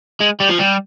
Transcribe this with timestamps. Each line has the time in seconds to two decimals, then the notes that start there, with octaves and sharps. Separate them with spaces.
0.21 G#3
0.40 G3
0.50 F3
0.59 G3